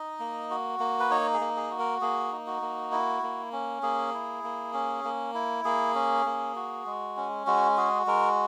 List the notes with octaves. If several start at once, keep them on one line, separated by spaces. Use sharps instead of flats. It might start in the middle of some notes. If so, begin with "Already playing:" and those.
Already playing: D#4 D#5
A#3
F#4
A#3
B4
D#4 C#5
G#4
A#3
G#4
F#4
A#4
A#3 G#4
D#4
F#4
A#3
E4
A#3
C#4
A#3 G#4
E4
A#3
C#4
A#3
E4
A#3 G#4
C#4
A#3
F#4
G#3
C#4
G#3 F#4
F#4 G#4
G#3 A#4